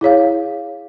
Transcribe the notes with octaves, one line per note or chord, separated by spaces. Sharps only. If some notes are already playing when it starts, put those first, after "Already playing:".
E4 G#4 C#5 F5